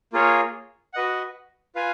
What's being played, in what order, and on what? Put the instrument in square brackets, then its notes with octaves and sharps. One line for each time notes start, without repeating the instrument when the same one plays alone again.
[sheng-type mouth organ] A#3 F4 G#4 C#5
F#4 B4 D#5 F#5
F4 B4 F5 G#5